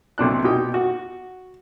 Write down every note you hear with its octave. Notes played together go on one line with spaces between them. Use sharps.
B1 C3 D4 F#6
B2 D#4 G4 G5
F#4